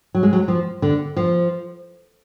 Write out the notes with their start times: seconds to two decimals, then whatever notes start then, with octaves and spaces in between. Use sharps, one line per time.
0.15 F#3
0.23 G#3
0.33 F#3
0.48 F3
0.82 D3
1.17 F3